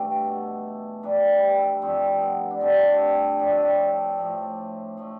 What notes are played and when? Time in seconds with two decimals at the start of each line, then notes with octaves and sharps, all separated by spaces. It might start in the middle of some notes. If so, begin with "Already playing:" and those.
Already playing: G2 E3 A3 G4 A4 B4
0.25 B2 A3
1.03 G2 E3 G3 B4
1.23 B4
1.36 G4
1.43 A4
1.55 B4
1.62 A4
1.82 G2 F3 A3 C4
2.21 B3
2.51 D4
2.61 G2 D3 A3 C4
2.95 C4 D4
3.39 A2 F3 A3 D4
3.50 C4
3.62 D4
4.18 A2 F3 A3
4.97 F3 A3